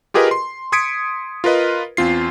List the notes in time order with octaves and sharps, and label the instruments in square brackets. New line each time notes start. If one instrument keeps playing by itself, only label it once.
[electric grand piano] F4 G4 G#4 A#4 B4 D#5
C6
C6 D#6 G#6 B6 C#7 D7
F4 A#4 B4 D#5
E2 C4 F4 C7